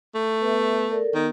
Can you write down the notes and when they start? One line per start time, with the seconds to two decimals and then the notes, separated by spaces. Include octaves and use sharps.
0.15 A3
0.41 B3 B4 E5
0.91 A4 A#4 D5
1.14 D#3 B3